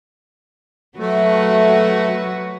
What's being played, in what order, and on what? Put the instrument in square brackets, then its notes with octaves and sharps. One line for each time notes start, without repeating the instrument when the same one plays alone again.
[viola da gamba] F#3 F#4 B4 [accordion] A3